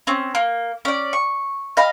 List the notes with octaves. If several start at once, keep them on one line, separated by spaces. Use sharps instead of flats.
C4 C#4
A#3
C#4 D5
C#6
D#5 F5 B5